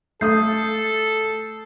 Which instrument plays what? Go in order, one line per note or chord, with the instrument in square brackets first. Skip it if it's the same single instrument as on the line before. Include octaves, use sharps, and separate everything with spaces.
[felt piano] A3 D#6 [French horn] A4 [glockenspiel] G6 C7